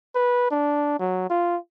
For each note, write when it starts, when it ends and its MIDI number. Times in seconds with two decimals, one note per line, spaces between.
0.15 0.49 71
0.51 0.97 62
0.99 1.27 54
1.30 1.57 65